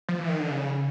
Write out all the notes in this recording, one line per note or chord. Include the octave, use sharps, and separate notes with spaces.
F3
E3
D#3
D3
C#3